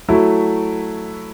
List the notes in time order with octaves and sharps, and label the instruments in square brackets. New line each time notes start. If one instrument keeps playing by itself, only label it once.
[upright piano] F#3 A3 E4